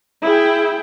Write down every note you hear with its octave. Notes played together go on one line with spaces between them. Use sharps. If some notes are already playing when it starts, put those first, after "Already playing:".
E4 G#4 G5